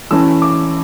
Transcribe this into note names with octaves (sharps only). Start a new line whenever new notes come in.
E3 A3 C#4 E6
D6